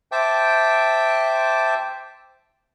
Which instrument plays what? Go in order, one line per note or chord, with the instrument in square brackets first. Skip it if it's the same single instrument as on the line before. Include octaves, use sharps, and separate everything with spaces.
[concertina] C5 E5 G5 A5 D6